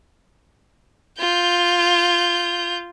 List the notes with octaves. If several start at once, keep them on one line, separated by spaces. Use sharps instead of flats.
F4 G6